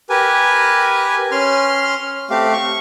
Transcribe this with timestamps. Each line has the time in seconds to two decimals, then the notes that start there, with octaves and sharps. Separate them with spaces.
0.10 G4 A#4 B4 G#5
1.31 C#4 C6 F6
2.30 A3 C4 G4 F5
2.53 C#6